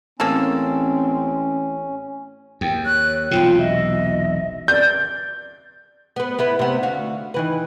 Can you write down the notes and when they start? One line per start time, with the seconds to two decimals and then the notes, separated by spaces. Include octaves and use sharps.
0.20 A1 A#3 C4 C#4 G#4 A4
2.61 D#2 G5
2.86 C#5 F#6
3.31 E1 B1 C3 F4 G5
3.59 D#5 E5
4.68 D5 G6
6.16 B3 B4
6.39 B3 E4 B4
6.59 C3 B3
6.83 D2 F#4 F5
7.34 D#3 E3 B4